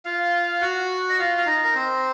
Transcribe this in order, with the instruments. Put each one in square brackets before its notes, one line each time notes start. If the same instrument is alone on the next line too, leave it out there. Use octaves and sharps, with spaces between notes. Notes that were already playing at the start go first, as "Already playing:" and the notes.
[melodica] F4 F5
F#4 F#5
D#5
F4 F5
F5
D#4 D#5
A#4
C4 C5